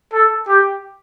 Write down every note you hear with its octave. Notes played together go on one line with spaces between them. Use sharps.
A4
G4